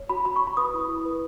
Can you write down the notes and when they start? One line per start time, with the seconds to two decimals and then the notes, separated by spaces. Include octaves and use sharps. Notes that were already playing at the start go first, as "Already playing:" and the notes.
Already playing: C#5
0.09 F#4 B5
0.25 F#4 B5
0.36 C#6
0.41 C#5
0.47 B5
0.57 B4 D#6
0.74 E4
0.89 E4
1.05 B4